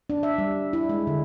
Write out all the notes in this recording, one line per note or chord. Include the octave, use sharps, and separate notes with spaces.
D4
E5
G3
E4
G#3
D3